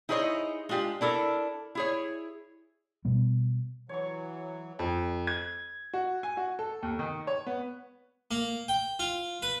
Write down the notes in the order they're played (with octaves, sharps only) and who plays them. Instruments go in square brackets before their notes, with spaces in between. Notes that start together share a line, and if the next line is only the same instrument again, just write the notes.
[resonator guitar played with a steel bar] D#4 E4 G#4 C5 C#5 D#5
G#3 D4 F4 G4
D4 E4 A4 A#4
E4 G#4 C#5
[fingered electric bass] B2 G3 B3
[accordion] E3 F#3 [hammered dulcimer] C#5 C#6
[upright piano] F2
G#6
F#4
G#5
F#4
A4
D#2
D#3
C#5
B3
[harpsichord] A#3
G5
F4
B4